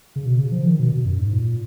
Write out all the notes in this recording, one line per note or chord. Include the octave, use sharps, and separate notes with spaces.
C#3
B2
C#3
F3
D#3
B2
B2
F#2
G#2
A#2